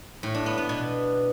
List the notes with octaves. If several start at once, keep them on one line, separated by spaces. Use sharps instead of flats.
A2
D4
B3
B3
B2